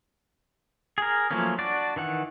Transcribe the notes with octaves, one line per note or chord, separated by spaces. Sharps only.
G#4 A#4
F3 F#3 A3 A#3 C#4
D4 F#4 D5
D#3 E3 F#5